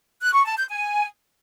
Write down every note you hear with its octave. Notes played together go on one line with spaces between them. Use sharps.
F#6
C#6
A5
G6
G#5